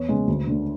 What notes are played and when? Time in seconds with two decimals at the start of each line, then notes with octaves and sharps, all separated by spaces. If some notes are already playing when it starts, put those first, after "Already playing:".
Already playing: E2 C#5
0.08 C#3 G#3 B3
0.27 D2
0.47 D3 A3